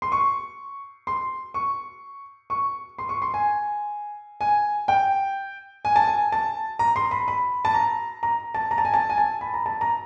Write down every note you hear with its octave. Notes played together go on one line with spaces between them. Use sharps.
C6
C#6
C6
C#6
C#6
C6
C#6
C6
G#5
G#5
G5
G#5
A5
G#5
A5
A#5
C6
B5
B5
A5
A#5
A#5
A5
A#5
A5
G#5
A5
G#5
A5
B5
A#5
A5
A#5